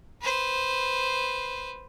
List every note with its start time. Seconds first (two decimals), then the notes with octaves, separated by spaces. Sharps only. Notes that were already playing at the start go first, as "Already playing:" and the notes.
0.21 B4 C5